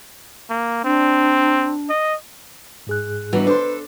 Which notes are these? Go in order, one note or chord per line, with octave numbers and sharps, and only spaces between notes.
A#3
C4 D4
D#5
G#2 G#4 F#6
G#2 D3 E3 F#3 G3 B3 D#4
D4 A4 B4 C5 C6